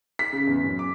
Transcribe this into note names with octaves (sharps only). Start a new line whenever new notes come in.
B6
C#3
E2
F#2
D6